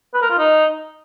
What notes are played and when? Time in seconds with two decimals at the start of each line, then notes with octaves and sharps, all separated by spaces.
0.14 B4
0.22 A#4
0.30 F4
0.38 D#4